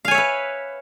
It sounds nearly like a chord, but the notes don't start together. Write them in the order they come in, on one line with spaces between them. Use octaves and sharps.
F5 G#5 C#5 E5 B4